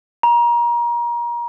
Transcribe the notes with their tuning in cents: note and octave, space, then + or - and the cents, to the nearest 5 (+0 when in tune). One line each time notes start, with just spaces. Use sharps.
A#5 +30